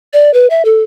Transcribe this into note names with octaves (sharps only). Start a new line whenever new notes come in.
D5
B4
E5
A4